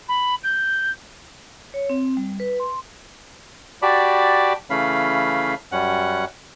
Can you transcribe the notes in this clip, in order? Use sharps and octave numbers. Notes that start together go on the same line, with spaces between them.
B5
G6
C#5
C4
G3
B4
C6
F#4 G4 D5 A5 B5 D6
C#3 E3 A3 C#4 F5 B5
F#2 G3 C#4 F#5 F#6